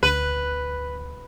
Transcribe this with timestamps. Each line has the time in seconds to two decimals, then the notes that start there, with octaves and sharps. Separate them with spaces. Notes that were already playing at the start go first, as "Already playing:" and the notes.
0.03 D2 B4